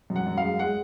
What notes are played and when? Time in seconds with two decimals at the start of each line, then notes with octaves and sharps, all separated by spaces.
0.10 F#2
0.16 F#5
0.27 F#2
0.37 F5
0.43 G#3
0.59 G#3 F#5